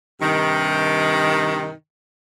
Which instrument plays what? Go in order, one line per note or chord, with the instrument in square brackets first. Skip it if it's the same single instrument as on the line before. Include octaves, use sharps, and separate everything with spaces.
[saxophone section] G2 C3 D#3